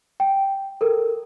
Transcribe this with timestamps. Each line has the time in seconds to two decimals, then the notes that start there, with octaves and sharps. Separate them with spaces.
0.20 G5
0.81 A4 A#4